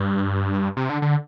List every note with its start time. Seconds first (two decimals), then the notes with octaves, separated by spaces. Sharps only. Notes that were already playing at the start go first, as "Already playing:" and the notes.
Already playing: G2
0.77 C3
0.90 D3
1.02 D3